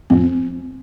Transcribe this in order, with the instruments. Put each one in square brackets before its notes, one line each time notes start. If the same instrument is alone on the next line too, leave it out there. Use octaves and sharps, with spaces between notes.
[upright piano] F2 [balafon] C4